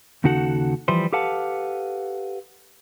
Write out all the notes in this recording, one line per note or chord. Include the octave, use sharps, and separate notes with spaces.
D#2 C#3 D#4 F#4 A4 F#5
E3 F3 G3 E4 B4 C5
G4 A4 B4 F5 F#5 A5